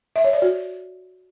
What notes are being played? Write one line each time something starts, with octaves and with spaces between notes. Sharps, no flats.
E5
C#5
D5
F#4